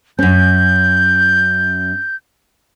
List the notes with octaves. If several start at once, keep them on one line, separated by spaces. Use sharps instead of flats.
F#2 C#4 G6